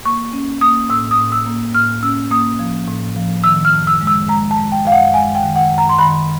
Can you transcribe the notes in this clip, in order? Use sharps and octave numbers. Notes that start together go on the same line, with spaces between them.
A#3 C#6
C#4
A#3 D#6
A2 E6
D#6
A2
E6
A#3
A2 F6
C#4 E6
A#3 D#6
F3
A2
F3
D#3 E6
F6
F#2
E6
G#3
E6
G#3 A#5
A5
G#3
G5
F#2 F5
F#5
G#3 G#5
G5
D#3
F#5
F#2
A#5
C6
D#3 B5